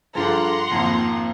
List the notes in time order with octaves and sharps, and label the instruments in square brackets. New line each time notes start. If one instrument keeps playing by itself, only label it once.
[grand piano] G2 F3 [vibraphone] G#4 A4 D6 [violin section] F#5 A#5 C6
[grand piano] G#1 F2 [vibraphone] A#3